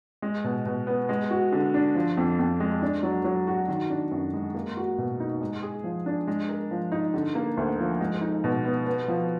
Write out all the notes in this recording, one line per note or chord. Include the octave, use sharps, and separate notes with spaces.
G#3
B2
B2
B3
G#3
F#4
D3
D4
F3
F2
F2
G#3
D4
F#3
F#3
F#4
D#3
D4
F#2
G#3
A#3
F#4
B2
D#4
G#3
G#4
F3
D4
G#3
A#4
F3
D#4
D3
A#3
D2
F3
G#3
D#4
B2
B3
B3
F3